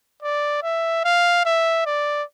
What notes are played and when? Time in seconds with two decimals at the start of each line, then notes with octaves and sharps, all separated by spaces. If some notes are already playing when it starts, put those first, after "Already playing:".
0.22 D5
0.63 E5
1.05 F5
1.45 E5
1.86 D5